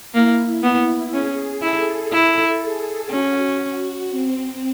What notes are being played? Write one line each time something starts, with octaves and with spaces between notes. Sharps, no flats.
A#3 E4
B3
C#4 G#4
E4 A4
E4
G#4
C#4 F#4
C4